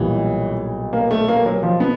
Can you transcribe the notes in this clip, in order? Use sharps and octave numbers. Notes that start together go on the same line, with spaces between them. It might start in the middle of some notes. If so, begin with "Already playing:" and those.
Already playing: B1 A#2 E3 G3
A#3
A3
A#3
F#3
F3
B3